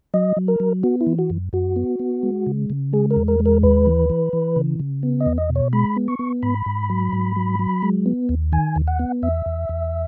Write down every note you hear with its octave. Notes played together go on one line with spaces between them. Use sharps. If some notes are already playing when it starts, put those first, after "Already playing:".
F#3 D#5
F#3
A#4
F#3
B3 F#4
E4
E3
F#4
F#2
F#2 F#4
B3
B3
G#3
C#3
C#3
G#3 G#4
A#4
E2
A#4
G#3
A#4
D#2 B4
E3
E3
E3
C#3
C#3
B3
D#5
E2
D#5
B2
C#5
G#3 B5
B3
C#6
B3
G#2 B5
G#2
F#3
G#2
F#3
F#3
G#3
B3
D#2
D#3 G#5
D#2
F#5
B3
E2 E5
E2
E2